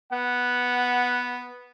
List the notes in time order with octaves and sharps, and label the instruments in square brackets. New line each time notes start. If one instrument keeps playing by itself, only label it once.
[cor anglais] B3 [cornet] F#5